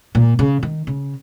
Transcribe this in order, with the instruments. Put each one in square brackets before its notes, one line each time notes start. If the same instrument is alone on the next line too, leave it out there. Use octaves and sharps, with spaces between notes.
[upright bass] A#2
C#3
D#3
C#3